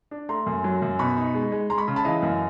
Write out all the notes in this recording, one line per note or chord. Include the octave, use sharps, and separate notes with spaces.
D4
A3 A#5 C6
F#2
F#3
F#2
B2 B5 C#6
D#4
G#3
G#3
G#3 A#5 C6
B5 C#6
C#3
A5 B5
E3 D#5 F5
F#2